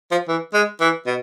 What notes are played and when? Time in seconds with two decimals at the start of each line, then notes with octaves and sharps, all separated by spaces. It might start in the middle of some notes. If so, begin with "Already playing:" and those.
0.11 F3
0.28 E3
0.54 G#3
0.81 E3
1.07 B2